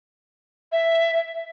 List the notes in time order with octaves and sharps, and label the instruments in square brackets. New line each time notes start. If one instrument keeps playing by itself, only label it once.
[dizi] E5